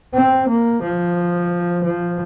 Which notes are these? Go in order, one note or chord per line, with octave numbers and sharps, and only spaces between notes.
C4
A#3
F3
F3